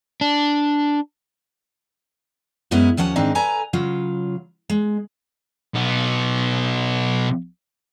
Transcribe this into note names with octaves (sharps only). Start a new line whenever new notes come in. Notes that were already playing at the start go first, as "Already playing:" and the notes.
D4
F#2 F#3 G#3 B3 C#4 E4
D#2 F3 C#4 F#5 A5
G#2 D#3 C4 D4 D#4
A4 B4 G#5 A#5
C#3 F#3 F4
G#3
B1 B3